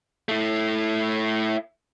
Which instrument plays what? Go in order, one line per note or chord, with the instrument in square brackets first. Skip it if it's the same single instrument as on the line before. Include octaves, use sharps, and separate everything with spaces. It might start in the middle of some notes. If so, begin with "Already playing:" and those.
[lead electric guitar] A3 E4